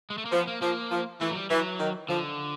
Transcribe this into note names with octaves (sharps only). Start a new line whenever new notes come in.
G#3
A3
A#3
F3 B3
A#3
F3 A#3
F3
E3 A3
F#3
G3
E3 F#3
D#3
D3 F3